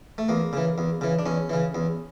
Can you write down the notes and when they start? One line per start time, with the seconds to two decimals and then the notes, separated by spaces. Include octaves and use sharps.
0.18 A3
0.29 E2 A#3
0.53 C#3 E3
0.78 E2
1.01 C#3 E3
1.19 D4
1.26 E2 C#4
1.50 C#3 E3
1.75 E2